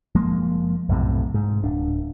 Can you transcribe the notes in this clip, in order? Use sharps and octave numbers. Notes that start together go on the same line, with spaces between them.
F#1 F3 G#3 A#3
B1 F#2 A2 C3
G#2
D1 D4